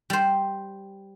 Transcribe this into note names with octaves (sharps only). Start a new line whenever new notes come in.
G3 C5